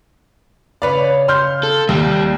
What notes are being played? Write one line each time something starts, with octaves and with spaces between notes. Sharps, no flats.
C#3 B4 C#5 D5 F5
C6 F6 G6
A4
D#2 G3